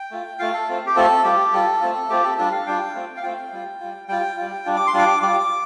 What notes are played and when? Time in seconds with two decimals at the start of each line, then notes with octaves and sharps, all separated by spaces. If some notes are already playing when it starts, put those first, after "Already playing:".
Already playing: G5
0.11 A3 F4
0.39 A3 F4 F5
0.54 A4
0.68 A3 C4 F4
0.86 G4
0.96 A3 C4 F4 A4
1.24 G3 F4 G4
1.53 G3 F4 A4
1.81 A3 C4 F4
2.09 A3 C4 F4 G4
2.24 A4
2.38 G3 D4 F4 A4
2.52 F5
2.67 G3 D4 F4 G5
2.95 A3 C4 F4
3.17 F5
3.23 A3 C4 F4 G5
3.52 G3 F4
3.80 G3 F4
4.08 G3 F4 G5
4.37 G3 F4
4.65 G3 D4 F4
4.76 D6
4.87 C6
4.94 G3 D4 F4 D6
5.22 G3 F4 D6